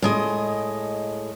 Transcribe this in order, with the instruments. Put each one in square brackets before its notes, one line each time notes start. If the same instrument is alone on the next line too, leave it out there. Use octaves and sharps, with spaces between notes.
[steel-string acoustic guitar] A2 G#3 D#5